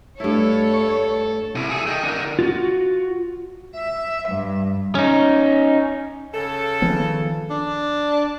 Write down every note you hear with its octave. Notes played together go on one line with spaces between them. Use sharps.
G2 A3 E4 A4 C#5
C3 E4
G#4 A4
D#5 G5
D3 A#4
F4 F#4
E5
G2
C#4 D#4
C#3 A4
D#3 F3 B3
D4